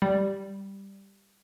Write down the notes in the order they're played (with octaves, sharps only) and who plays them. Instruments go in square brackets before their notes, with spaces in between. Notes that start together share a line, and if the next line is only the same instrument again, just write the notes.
[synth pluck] G3